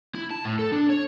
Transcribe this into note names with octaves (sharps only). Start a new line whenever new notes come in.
E4
A5
A2
A4
D4
C#5